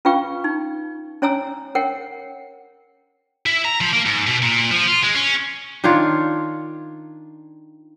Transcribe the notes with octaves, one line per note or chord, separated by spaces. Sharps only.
C#4 F4 B4 F5 G5 C#6
D#4
C#4 C#5 G#5 A#5 E6
A#4 C#5 F#5 G5
E4
A#5
F3
A#3
G#2
B2
A#2
F3
F4
G#3
C#4
D#3 D4 F4 C#5